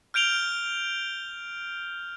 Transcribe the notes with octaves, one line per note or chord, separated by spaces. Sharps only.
F6 G6 D7 F7 G7